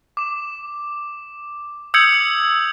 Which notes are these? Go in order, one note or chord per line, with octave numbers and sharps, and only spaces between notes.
D6 E7
D#6 E6 G6 G#6 C#7 F#7